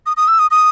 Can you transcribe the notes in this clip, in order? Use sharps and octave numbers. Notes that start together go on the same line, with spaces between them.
D#6
D#6
E6
D#6
D#6